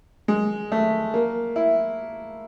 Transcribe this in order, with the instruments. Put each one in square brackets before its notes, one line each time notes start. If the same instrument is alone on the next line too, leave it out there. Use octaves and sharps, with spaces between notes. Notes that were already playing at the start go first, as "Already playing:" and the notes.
[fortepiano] G#3
A3
A#3
E4